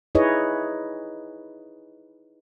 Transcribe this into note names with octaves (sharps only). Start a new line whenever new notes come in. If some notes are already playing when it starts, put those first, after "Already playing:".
D#4 E4 G#4 B4 C#5 D#5